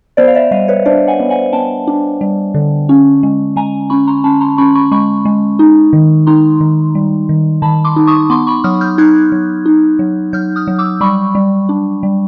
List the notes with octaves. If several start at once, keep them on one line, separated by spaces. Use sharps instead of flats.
B3 C5 D5
F5
D5 E5
G3 D#5 F5
B4 C#5
D4 C5 D5
F#5 G#5
B3
F#5 G#5
B3 G5 A5
D4
G3
D3
C#4
G#3
G#3 G#5 A#5
C#4 B5 C#6
A#5 C6
C#4 A5 B5
A#5 C6
C#4 B5 C#6
B5 C#6
G#3 B5 C#6
G#3
D#4
D#3
D#4 A#5 C6
D#3
G3
D#3
D#3 A5 B5
C6 D6
D#4
C#6 D#6
B3 C6 D6
B5 C#6
F#3 D#6 F6
F6 G6
D#4 F#6 G#6
F#3
D#4
F#3
F#3 F6 G6
D#6 F6
F#3
D6 E6
G3 B5 C#6
G3
D4
G3